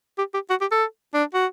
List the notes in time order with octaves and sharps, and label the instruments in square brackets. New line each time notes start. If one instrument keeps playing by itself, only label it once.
[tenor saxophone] G4
G4
F#4
G4
A4
D4
F#4